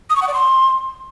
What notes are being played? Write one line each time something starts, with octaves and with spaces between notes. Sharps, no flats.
D#6
C#6
F#5
D5
C6